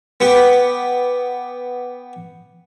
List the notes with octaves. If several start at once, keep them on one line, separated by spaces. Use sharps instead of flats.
B3 G4